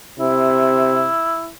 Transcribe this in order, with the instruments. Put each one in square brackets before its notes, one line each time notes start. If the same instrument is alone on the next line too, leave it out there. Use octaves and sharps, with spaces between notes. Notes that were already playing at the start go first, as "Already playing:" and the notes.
[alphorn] C3 [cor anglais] E4